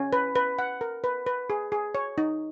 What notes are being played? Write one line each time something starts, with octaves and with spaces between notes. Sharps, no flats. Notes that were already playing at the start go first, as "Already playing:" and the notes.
Already playing: C#4
B4
B4
F#5
A#4
B4
B4
G#4
G#4
C#5
D#4